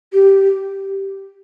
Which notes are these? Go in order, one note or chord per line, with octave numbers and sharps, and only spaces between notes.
G4